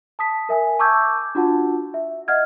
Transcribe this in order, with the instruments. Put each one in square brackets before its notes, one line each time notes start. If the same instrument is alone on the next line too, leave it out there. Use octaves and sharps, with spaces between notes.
[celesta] A5 D#6 B6
A#4 E5 G#5
A5 C#6 D6 E6 G6 G#6
D4 F4 F#4 F#5 A5
E5
D#5 E5 F#5 F6 G#6